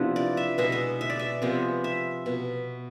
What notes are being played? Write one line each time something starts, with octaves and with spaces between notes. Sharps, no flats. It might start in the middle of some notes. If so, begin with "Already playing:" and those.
Already playing: C3 F3 B3 D4 E4
D5
E5
B2 G#3 B3 E5
E5
E5
D5
E5
C3 F3 G#3 B3
E5
B2